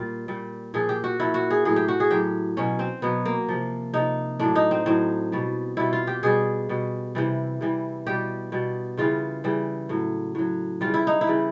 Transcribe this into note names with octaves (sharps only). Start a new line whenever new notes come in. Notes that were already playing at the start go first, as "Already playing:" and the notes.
Already playing: A#2 G3 F4
A#2 G3
A#2 F3 G#4
G4
F#4
A#2 F3 E4
F#4
G#4
A2 F#3 G#4
G4
F#4
G#4
A2 F#3 G4
B2 F#3 C#4
C4
B2 F#3 B3
A#3
C3 F3
C3 F3 D#4
A2 F#3 D4
D#4
C4
A2 F#3 C4
B2 G3
B2 G3 E4
F4
G4
B2 G3 G#4
B2 G3
C3 E3 G3
C3 E3 G3
B2 G3 G4
B2 G3
C#3 E3 G3 F4
C#3 E3 G3
A2 F#3
A2 F#3
C#3 E3 G3 F4
E4
D#4
E4
C#3 E3 G3